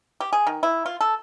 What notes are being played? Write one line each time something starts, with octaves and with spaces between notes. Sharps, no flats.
G4
G#4
D#3
E4
F4
A4